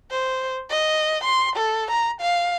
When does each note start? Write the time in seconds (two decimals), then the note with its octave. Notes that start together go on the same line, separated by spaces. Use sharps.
0.11 C5
0.70 D#5
1.24 C6
1.56 A4
1.91 A#5
2.21 F5